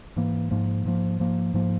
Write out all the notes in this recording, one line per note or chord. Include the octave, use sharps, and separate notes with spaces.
G#2 E3 A#3
G#2 F3 A#3
G#2 F3 A#3
G#2 F3 A#3
G#2 F3 A#3